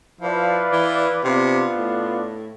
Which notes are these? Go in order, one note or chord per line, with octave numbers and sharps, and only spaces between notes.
F3 E4 B4 D5 F5
E3
C3 B3 D4 F4
A2